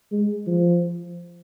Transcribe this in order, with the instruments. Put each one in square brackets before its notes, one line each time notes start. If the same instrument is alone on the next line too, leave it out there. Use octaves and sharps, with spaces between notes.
[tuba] G#3
F3